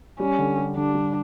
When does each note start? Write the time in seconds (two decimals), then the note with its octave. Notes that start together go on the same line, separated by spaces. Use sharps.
0.20 G3 C#4
0.38 D3
0.58 G4
0.76 D3 D4
0.94 G3